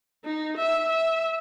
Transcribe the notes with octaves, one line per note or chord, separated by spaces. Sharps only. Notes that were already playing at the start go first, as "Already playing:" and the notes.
D#4
E5
E5